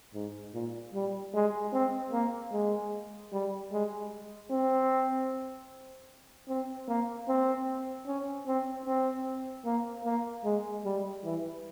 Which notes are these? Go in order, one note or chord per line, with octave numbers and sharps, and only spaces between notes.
G#2
A#2
G3
G#3
C4
A#3
G#3
G3
G#3
C4
C4
A#3
C4
C#4
C4
C4
A#3
A#3
G#3
G3
E3